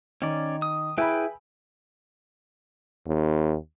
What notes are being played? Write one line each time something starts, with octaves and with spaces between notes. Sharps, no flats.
D#3 C#4 D5
D#6
E4 G#4 B4 G5 G#5 B5
D#2